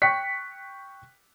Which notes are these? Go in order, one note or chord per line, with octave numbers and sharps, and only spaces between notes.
G5 C#6 F#6 B6 C#7